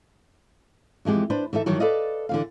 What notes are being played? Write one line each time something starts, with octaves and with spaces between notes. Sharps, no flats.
F2 E3 G#3 G4
D4 B4 C5
E3 D#4 A4 E5
G2 D#3 E3 F#3
A4 B4 D5 D#5 F5
D3 E3 F5